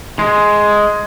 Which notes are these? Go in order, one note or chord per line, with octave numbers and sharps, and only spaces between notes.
G#3